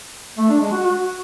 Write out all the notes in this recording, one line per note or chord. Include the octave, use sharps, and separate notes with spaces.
A3
D4
G#3
F#4
F#4